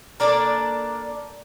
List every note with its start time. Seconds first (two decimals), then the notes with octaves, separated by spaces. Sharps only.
0.20 A#3 D4 A4 D5